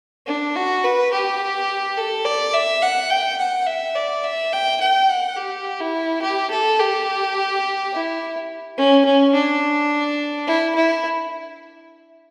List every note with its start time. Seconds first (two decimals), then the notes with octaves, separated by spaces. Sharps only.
0.27 D4
0.56 F#4
0.84 B4
1.13 G4
1.98 A4
2.25 D5
2.54 E5
2.82 F#5
3.10 G5
3.38 F#5
3.67 E5
3.95 D5
4.24 E5
4.53 G5
4.81 G5
5.09 F#5
5.37 G4
5.80 E4
6.22 G4
6.51 A4
6.80 G4
7.93 E4
8.77 C#4
9.05 C#4
9.34 D4
10.47 E4
10.75 E4